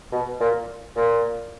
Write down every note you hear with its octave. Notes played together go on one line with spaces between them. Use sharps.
B2
A#2
A#2